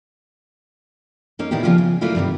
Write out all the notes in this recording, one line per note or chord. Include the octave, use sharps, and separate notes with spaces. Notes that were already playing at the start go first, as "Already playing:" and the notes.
A#3 C#4 D#4
A#2 D#3 A#3 B3 E4 G4
C#3 E3 F3 G3 A#3 F4
C#3
F#3 A3 A#3 D4 E4 F4
G2 C3 D#3 G3